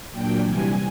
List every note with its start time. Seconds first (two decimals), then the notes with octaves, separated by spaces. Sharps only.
0.11 A#2 F#3 A#3 D4 G5
0.43 C3 E3 G3 G#5